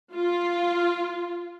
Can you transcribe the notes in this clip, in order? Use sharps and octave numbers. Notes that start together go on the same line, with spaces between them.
F4